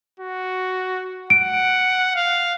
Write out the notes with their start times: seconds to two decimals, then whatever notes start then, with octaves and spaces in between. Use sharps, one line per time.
0.20 F#4
1.30 F#5 D7
2.16 F5